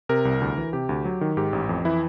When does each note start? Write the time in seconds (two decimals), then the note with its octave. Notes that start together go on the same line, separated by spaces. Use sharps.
0.09 C3 A#4
0.25 C2
0.41 D2
0.57 E3
0.73 C3 G4
0.89 D2
1.05 F#3
1.21 D#3
1.37 G#2 G4
1.53 A1
1.69 F2
1.85 E3 E4